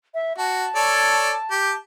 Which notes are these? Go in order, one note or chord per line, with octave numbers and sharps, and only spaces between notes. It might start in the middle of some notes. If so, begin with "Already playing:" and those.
E5
F#4 A5
A4 C#5 D5
G4